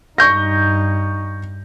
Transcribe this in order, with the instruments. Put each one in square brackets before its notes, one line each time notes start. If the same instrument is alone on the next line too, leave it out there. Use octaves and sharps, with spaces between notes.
[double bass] G2 D#4 [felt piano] C#6 G6 A#6